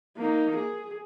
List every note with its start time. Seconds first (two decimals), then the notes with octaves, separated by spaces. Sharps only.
0.17 A#3 D#4
0.56 G#4